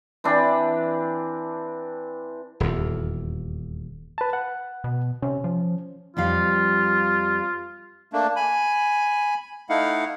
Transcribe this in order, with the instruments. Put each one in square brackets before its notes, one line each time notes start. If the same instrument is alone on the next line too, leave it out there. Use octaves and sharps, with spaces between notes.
[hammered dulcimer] E3 C4 D4
[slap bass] D#1 E2
[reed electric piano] B4 A5
F#5
[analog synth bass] B2
[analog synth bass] C3 [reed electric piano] C#4
[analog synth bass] F3
[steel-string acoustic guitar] F2 G3 F5 [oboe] F4
[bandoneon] A3 A#3 D4
G#5 B5
A3 D#4 E4 F5 F#5